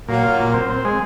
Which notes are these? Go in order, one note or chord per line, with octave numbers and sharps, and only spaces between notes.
A#2 F#3 A#3
F4
A#2
C4
C4
G#3